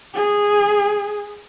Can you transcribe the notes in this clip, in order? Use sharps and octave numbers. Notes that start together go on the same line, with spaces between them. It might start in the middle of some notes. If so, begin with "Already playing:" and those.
G#4